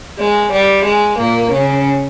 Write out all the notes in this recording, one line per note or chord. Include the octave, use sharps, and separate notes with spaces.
G#3
G3
G#3
A#2 A#3
C#3 C#4